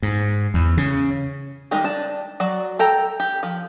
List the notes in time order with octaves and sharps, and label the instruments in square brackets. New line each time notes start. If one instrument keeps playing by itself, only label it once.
[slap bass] G#2
E2
C#3
[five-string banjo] D#3 G3 G#3 D#4
D4 A5
F#3 F#4 D5
A4 G5 A#5
G4
F3